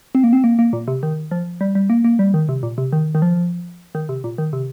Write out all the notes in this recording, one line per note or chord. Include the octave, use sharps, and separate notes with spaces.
C4
A#3
C4
A#3
A#3
A#2
C3
D#3
F3
G3
G3
A#3
A#3
G3
D#3
C3
A#2
C3
D#3
D#3
F3
D#3
C3
A#2
D#3
C3